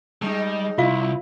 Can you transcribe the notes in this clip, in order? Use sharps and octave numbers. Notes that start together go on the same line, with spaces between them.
G3 G#3 D#4
C2 E4 F4 F5